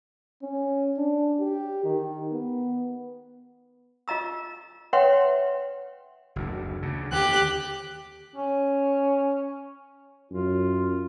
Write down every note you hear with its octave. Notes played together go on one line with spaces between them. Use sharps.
C#4
D4
G4
D#3
B3
F4 D#5 A#5 E6
B4 C#5 E5 F#5 G5 C6
F#1 D2
D2 C#3
D#2 D3 G4 F#6
C#4
F#2 F4